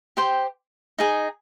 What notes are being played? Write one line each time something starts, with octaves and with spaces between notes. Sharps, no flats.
G4 C5 G5 C6
D#4 G#4 D#5 G#5